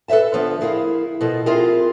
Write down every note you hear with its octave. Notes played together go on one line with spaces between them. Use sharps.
A4 B4 C#5 E5 A5
D3 F3 B3
E4 G#4 A#4 F5
B2 F3 A4
C4 E4 F4 G4 G#4 A#4